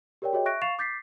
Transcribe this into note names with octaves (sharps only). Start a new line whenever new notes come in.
G4 A#4 C#5 D5 G5
F#4 G#4 C#5 D#5 G5
E5 C#6 F#6 A#6 D7
F5 C#6 A6 C7 E7 F7
D6 G6 A6 B6 C7